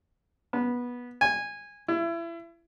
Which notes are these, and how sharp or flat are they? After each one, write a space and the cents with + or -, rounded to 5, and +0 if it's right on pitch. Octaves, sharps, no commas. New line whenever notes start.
B3 -15
G#5 -15
E4 +30